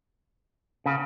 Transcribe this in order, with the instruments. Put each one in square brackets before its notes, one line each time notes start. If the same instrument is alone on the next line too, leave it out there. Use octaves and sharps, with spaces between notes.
[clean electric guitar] C#3